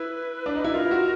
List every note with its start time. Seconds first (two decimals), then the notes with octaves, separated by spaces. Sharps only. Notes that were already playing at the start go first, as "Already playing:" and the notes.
Already playing: E4 B4
0.46 D4
0.55 D#4
0.64 E4
0.73 F4 A#4
0.91 F#4